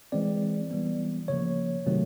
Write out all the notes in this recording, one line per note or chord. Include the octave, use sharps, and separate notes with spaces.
E3 G#3 C4 D5
E3 G3 B3
C#3 F3 A#3 C#5
C3 D#3 F#3 A3 C4